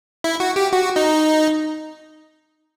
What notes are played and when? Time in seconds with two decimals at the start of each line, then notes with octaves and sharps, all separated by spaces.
0.24 E4
0.40 F#4
0.56 G4
0.72 F#4
0.96 D#4